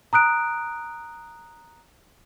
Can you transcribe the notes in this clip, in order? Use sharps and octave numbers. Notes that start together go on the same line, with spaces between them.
A#5 D#6 F#6 D7